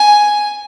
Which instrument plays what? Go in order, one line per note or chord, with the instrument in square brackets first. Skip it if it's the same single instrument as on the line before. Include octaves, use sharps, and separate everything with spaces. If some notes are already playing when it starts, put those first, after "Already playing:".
Already playing: [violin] G#5